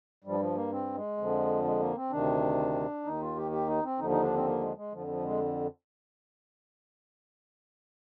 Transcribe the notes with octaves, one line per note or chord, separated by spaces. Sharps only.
G2 F3 G3
F3
A#3
C4
G#3
F2 D3 F3
G#3
A#3
C4
D2 C3 D#3 D4
D#2 D#3 D#4
F4
G4
G4
D#4
C4
D#2 D3 F3 D#4
D#4
D4
C4
A#3
G#3
G#3
F2 D3 F3
F3
G#3